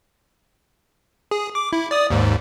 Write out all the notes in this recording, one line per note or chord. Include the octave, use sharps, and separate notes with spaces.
G#4
D6
E4
D5 D#6
D#2 G#2